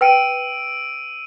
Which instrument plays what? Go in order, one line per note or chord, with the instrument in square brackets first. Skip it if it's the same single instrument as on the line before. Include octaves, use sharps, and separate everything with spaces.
[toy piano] B4 G5 [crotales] E6 D7 D#7